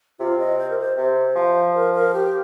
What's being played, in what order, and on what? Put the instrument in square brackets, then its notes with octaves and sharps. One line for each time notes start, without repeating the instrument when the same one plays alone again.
[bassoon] C3 [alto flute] F4
[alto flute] D#5
C5
A#4
C5
[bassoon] C3 [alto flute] C5
[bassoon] F3
[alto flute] A#4
A#4
G4